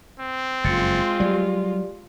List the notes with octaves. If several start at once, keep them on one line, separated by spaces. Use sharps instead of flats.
C4
F#1 F2 G#3 F4 A6 C#7
F#3 G3 G4 D5